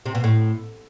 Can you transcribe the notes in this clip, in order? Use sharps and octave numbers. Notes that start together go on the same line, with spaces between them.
C3
B2
A2